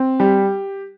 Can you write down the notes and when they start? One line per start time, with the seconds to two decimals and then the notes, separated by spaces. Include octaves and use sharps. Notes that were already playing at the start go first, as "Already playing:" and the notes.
Already playing: C4
0.20 G3 G4